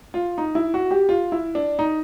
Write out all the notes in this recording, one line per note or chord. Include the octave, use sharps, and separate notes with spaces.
F4
D#4
E4
F#4
G4
F4
E4
D4
D#4